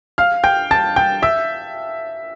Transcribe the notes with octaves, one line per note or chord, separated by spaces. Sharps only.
F5 F6
G5 G6
A5 A6
G5 G6
E5 E6